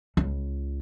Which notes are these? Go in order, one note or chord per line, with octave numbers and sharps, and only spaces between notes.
C#2